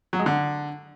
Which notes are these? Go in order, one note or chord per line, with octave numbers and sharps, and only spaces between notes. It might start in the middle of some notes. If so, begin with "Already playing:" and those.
F#3
G#3
D3